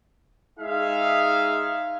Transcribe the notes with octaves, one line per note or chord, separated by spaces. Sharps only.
G#3 D#4 G#4 E5 F5